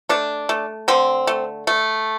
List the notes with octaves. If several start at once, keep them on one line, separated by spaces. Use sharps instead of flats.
A3 D4
A3
D3 C4
A3
A3